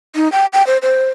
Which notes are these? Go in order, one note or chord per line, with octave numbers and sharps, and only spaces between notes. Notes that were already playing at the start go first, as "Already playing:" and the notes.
D#4
G5
G5
C5
C5